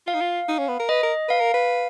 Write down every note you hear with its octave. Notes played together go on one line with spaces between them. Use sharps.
F4 F5
D#4
F4
D#4
C#4
B3
A#4
B4 D#5
A#4
B4 F5
A#4
B4